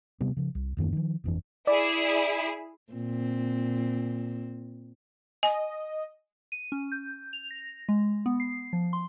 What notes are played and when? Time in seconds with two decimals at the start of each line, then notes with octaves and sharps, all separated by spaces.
0.20 C3 G3 B3
0.37 C#3 F3
0.55 C2
0.77 D#1 F#2 D#3 A#3
0.92 D#3 F3
1.24 G1 F2 E3 D4
1.67 E4 G#4 D5
2.92 A#2 C4
5.43 D#5 G#5
6.52 D#7
6.72 C#4
6.92 G6
7.33 F7
7.51 A#6
7.89 G#3
8.26 B3
8.40 C7
8.73 F3
8.93 C6